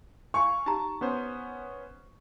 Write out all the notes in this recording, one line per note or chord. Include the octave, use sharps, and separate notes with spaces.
F5 G#5 C#6
D#4 G4 A5 A#5
B3 C#4 C5